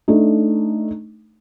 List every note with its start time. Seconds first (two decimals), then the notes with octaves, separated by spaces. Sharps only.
0.08 A3 D4 D#4